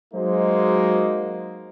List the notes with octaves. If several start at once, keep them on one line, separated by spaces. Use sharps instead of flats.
F#3 G#3 A#3 D#4 F#4 C5